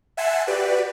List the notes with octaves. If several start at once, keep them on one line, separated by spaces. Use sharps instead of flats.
E5 F#5 G#5 A5 C6 E6
F#4 G4 B4 D5